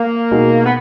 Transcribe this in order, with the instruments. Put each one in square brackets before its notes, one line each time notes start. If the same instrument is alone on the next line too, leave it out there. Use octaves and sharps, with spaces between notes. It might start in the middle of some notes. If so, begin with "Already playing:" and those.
Already playing: [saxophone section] A#3
[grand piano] B2 G#3 D#4 F#4
[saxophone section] B3